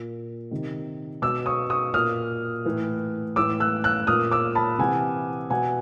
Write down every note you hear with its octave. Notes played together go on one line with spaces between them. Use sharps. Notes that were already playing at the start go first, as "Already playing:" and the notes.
Already playing: A#2
C3 D#3
B2 D6 E6
C#6 D#6
C#6 D#6
A#2 D#6 F6
A2 E3
A2 E3 D6 E6
E6 F#6
E6 F#6
A#2 D#6 F6
D6 E6
A5 B5
C3 E3 F#5 G#5
B2 F#5 G#5